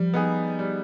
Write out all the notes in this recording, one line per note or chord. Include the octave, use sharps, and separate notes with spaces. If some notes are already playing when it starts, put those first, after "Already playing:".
Already playing: F3 G3
B3 D#4 G#4
G3